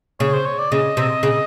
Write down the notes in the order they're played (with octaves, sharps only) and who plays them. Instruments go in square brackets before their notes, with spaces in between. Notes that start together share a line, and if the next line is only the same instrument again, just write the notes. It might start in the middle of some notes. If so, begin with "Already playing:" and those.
[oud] C#3 [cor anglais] C#5
[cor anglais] C5
C#5
D5
[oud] C#3 [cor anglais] D#5
[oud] C3
C#3